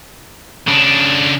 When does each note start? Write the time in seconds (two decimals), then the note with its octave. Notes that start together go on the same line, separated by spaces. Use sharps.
0.67 C#3 D4